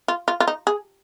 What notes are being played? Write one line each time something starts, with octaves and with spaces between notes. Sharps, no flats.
F4
F4
F4
D#4
G#4